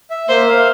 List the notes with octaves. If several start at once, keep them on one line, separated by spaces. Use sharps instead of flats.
E5
A#3 C5
F5